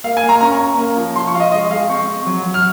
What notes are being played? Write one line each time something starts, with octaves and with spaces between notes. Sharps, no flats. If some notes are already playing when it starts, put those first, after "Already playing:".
A#3 F5
G#5
A#3
A#5
C#4 A#5
C#4
A#3
F3
F3 C6
C#6
F3 F5
D#5
G#3 D#5
G#3 F5
C4 C#6
C4
F#3
F#3
F6